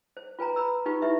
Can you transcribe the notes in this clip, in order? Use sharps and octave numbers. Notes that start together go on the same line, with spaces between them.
C5
F4 B4 G#5 A#5
B4 A#5 B5 E6
D#4 F4 G4 B4
E4 G4 B4 E5